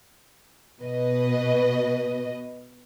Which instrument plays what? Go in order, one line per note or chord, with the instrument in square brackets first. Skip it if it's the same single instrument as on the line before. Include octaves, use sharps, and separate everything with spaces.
[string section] B2 B4 D#5